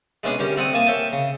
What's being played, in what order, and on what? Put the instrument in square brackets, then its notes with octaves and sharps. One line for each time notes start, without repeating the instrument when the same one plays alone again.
[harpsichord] G#3 A3 B3 C#4 D4 G#4
D3 G3 C#4 G4 A#4
A3 C4 A4 F#5 A#5 D#6
A#3 G#5 A5 D#6
A#4 C#5 E5 G5 A5
C#3